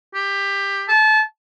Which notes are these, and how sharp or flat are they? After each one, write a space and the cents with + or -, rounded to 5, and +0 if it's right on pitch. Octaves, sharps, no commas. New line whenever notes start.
G4 +15
A5 -30